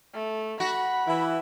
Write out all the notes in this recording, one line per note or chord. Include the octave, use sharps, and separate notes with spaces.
A3
F#4 B5
E3 E4